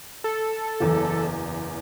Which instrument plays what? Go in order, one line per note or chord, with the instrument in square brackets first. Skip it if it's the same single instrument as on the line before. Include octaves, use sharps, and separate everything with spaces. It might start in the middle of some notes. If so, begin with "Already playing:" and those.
[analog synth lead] A4
[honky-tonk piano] F#1 E2